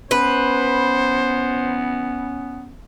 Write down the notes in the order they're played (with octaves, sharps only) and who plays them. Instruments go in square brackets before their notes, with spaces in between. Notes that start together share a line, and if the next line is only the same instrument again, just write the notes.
[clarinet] B3 [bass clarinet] C#4 [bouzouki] B4 [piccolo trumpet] C5